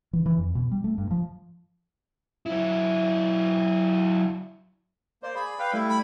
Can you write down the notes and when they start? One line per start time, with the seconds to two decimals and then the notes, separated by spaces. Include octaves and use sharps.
0.13 E3
0.26 E3
0.38 F2
0.55 B2
0.71 G3
0.84 A3
0.98 G2
1.11 F3
2.46 F#3 E4
5.23 A#3 C5 D5
5.35 G#4 B5
5.59 B4 F5 G5
5.73 G3 A3 E4
5.89 B5